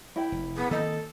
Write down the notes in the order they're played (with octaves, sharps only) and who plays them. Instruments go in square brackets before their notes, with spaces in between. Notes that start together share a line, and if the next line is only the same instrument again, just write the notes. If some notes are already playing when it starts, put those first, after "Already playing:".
[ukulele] E4 G5
[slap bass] F1
[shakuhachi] B3 [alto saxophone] G#4
[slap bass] D#3 A#3 C4 [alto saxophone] A4 [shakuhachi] D#5